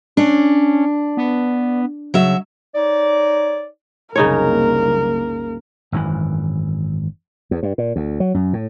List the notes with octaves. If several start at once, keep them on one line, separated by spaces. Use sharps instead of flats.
C#4 D4
B3
C#3 F#3 E5
D#4 C#5 D5
F#1 C2 C#3 A#3 D#4 A#4 C#5
G#1 F#2 B2 E3
E2
G2
A#2
D2
F#3
F#2
A2